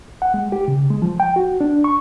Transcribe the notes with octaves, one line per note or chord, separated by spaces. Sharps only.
F#5
G#3
G4
C#3
G#3
F3
G5
F#4
D4
C#6